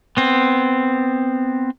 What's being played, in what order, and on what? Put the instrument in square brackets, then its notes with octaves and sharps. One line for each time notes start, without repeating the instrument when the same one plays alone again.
[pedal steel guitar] B3 C4